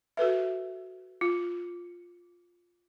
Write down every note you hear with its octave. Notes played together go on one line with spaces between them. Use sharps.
F#4 A4 B4 E5
F4